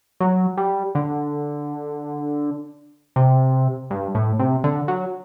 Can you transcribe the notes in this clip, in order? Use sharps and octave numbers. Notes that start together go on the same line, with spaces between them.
F#3
G3
D3
C3
G2
A2
C3
D3
F#3